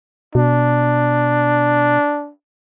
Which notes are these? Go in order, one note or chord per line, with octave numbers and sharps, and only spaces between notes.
B2 D4